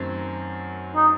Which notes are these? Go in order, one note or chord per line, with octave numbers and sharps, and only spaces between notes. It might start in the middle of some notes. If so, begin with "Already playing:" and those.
Already playing: F#2 D#3 F#3 A3 C4
D#4